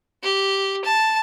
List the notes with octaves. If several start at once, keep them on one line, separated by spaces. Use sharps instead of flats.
G4
A5